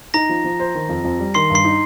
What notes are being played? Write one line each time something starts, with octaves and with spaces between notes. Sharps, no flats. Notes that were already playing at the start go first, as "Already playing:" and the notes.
D#4 A#5 A#6
F3
F3
C5
D#3
F2
F2
G3
D#3 C6 C7
G2
C6 C7
D#4